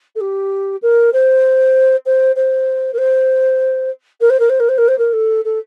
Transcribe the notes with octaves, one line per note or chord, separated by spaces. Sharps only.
A4
G4
A#4
C5
C5
C5
A#4
C5
A#4
C5
A#4
C5
A#4
C5
A#4
C5
A#4
A4
A4